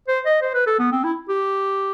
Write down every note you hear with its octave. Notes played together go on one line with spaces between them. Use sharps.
C5
D#5
C5
B4
A4
B3
C4
E4
G4